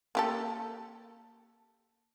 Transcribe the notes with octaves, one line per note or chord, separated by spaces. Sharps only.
A#3 G4 A4